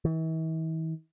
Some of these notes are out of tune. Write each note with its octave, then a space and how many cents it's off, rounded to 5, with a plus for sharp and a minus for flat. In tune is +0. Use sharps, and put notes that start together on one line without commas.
E3 -45